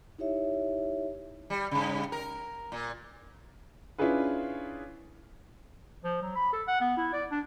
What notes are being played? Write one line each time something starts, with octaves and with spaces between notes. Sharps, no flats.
D#4 E4 G4 C#5 E5
G3
G2 C#3
A#4
A#2
C#4 D4 E4 F4 G#4 B4
F3
F#3
B5
A4
F#5
B3
E4
D5
D4